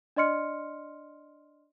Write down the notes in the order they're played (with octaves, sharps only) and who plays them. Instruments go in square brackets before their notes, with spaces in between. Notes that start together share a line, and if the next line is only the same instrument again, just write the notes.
[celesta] D4 D5 D#5 C6 F6 C#7